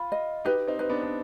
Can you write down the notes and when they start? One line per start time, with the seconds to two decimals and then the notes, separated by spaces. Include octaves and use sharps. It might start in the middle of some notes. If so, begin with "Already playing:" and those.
Already playing: F4 B5
0.12 D#5
0.45 D#4 G4 B4
0.67 C4 D#4
0.79 D#4 B4
0.90 B3 D4
1.02 D4